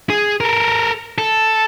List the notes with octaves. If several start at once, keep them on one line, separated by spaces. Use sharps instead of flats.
G#4
A4 A#4
A4